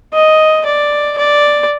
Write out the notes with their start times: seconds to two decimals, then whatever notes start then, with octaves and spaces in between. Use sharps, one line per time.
0.13 D#5
0.65 D5
1.18 D5